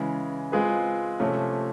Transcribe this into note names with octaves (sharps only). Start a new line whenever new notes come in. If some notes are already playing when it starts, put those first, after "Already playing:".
Already playing: C#3 E3 G#3
G#3 C4 F4 G#4 B4
C3 F3 A3 C#4